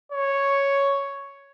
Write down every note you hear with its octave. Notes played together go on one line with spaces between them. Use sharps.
C#5